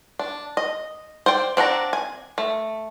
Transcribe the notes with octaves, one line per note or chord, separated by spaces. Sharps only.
D4
D#5
C5 D5 G5
C4 D4 F#5 A#5
G#5
A3